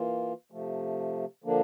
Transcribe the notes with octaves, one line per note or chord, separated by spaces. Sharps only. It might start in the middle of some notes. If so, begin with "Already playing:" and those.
Already playing: E3 A#3 F4
C3 F3 A3
D3 F3 A#3 D4